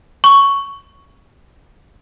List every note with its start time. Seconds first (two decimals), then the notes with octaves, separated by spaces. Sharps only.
0.24 C#6